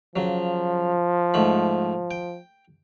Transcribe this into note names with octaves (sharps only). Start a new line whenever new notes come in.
C#3 F3 F#3
G#2 A3 B5
G5